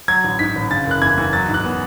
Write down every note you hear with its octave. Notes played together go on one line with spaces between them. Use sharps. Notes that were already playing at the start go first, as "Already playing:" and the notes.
F#3 G#6
A1
G#2 B6
A1
C#3 A6
F#1 F#6
E2 G#6
E2
F#3 A6
G#2
F#6
B3